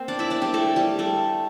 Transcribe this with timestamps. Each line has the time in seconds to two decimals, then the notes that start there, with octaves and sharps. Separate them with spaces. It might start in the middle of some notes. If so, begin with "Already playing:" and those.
Already playing: A#3 C4 C5
0.08 D4 D5
0.19 E4 E5
0.30 D4 D5
0.42 G3 G4
0.54 A3 A4
0.76 G3 G4
0.99 A3 A4